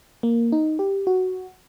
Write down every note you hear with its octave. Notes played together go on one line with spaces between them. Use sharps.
A#3
D#4
G4
F#4